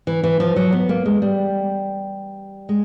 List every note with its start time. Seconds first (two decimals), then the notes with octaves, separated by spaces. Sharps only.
0.07 E3
0.23 E3
0.40 F3
0.56 F#3
0.73 B3
0.89 A#3
1.06 G#3
1.22 G3
2.69 G#3